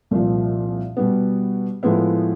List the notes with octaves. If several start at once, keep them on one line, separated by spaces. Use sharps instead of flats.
C2 A#2 F3
B2 G3 B3
A2 F3 G#3 B3 E4